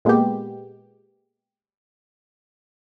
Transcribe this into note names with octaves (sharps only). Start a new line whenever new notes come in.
A#2 G#3 A#3 B3 G4